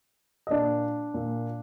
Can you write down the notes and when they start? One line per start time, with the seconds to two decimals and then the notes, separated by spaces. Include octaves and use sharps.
0.47 D#5
0.51 A#2 D4 D5
1.14 A#2